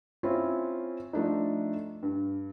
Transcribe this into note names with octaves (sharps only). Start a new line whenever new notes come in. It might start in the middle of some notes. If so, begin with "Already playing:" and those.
C4 C#4 E4 F4
F3 A3 D4 D#4
G2